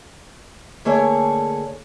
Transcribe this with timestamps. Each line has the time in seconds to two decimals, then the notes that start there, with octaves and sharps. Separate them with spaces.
0.85 D3 A3 A#3 G#4 C#5